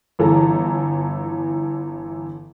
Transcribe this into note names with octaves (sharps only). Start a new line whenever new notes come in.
G1 E3 A4 A5 A#5